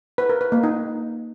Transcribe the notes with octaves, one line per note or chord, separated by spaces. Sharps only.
B4
A#4
B4
A#3
D#4